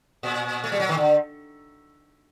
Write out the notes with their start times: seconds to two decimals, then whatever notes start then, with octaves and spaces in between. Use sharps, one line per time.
0.23 A#2
0.64 A3
0.72 G3
0.80 F#3
0.89 D#3
0.97 D3